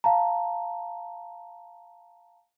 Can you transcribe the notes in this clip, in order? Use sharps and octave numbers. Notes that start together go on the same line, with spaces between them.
F5 A5 A#5